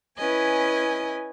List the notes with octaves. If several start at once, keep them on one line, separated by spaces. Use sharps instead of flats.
C#4 E4 B4 D#5 G#5